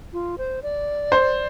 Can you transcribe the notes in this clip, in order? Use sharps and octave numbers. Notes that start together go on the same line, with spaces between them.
F4
C5
D5
C5